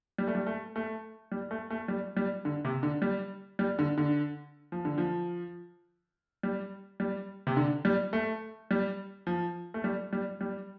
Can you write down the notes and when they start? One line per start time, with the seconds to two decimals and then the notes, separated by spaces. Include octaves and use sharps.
0.18 G3
0.28 A3
0.35 G3
0.47 A3
0.76 A3
1.32 G3
1.51 A3
1.70 A3
1.88 G3
2.17 G3
2.45 D3
2.65 C3
2.83 D3
3.02 G3
3.59 G3
3.79 D3
3.98 D3
4.72 F3
4.85 D3
4.98 F3
6.43 G3
7.00 G3
7.47 C3
7.57 D3
7.85 G3
8.13 A3
8.71 G3
9.27 F3
9.74 A3
9.84 G3
10.13 G3
10.41 G3